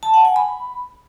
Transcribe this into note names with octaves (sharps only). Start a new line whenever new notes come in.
A5
F#5
G#5
B5